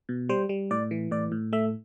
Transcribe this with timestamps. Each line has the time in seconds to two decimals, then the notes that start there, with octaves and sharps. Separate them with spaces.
0.09 B2
0.29 G3 C5
0.49 G3
0.71 A2 D5
0.91 E3
1.11 A2 D5
1.32 A2
1.53 A3 E5